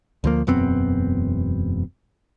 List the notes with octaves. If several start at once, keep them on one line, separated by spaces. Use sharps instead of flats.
D2 F3 A#3
E1 F#2 B3 C4